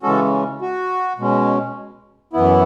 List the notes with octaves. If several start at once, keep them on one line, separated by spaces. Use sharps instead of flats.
C#3 E3 G#3 C#4 F#4 A4
F#4
B2 G#3 C#4
F#2 E3 B3 E4